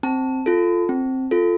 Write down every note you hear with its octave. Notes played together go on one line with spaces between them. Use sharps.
C4 A5
F4 A4
C4
F4 A4